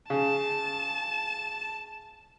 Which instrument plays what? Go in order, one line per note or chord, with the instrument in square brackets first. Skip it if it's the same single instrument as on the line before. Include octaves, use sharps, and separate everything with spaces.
[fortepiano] C#3 [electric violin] A5